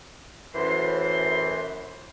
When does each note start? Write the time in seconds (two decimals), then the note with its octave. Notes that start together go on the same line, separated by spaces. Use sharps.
0.55 F#2 A2 E3 C5 C6